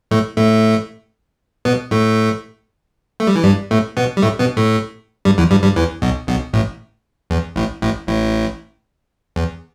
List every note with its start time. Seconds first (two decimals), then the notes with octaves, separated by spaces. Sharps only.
0.11 A2 A3
0.37 A2 A3
1.65 B2 B3
1.91 A2 A3
3.20 A3
3.27 G3
3.36 E3
3.43 G2 G3
3.71 A2 A3
3.97 B2 B3
4.17 G3
4.22 A2 A3
4.39 B2 B3
4.57 A2 A3
5.25 G2 G3
5.38 E2 E3
5.51 G2 G3
5.64 G2 G3
5.76 E2 E3
6.02 B1 B2
6.27 B1 B2
6.53 A1 A2
7.30 E2
7.56 A1 A2
7.82 A1 A2
8.07 A1 A2
9.36 E2